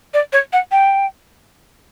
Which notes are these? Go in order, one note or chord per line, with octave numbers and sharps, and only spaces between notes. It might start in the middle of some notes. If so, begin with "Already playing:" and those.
D5
C#5
F#5
G5